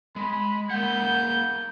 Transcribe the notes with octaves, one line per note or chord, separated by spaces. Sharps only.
G#3 B5
A#3 E5 F#5 G6